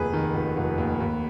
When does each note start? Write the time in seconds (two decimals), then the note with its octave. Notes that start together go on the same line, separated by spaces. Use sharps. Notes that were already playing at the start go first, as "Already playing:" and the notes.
Already playing: F1 D#2 G#4 B4
0.13 D#3
0.34 F1
0.57 F1
0.78 D#2
1.00 D#2